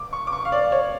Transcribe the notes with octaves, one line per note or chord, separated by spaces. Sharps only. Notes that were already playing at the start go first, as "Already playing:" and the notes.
Already playing: D6
C#6
D6
C#6
F5
D5
C#5